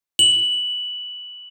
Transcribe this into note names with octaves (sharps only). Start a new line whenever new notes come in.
F#7